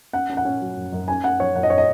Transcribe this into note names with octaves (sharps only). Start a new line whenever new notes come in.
C#4 F#5
C#4
F#5
C#4
F#3
F#2
F#2
C#4 G#5
C#4 F#5
F#2 C#5
F#2 F#5
D#5
C#5
D#5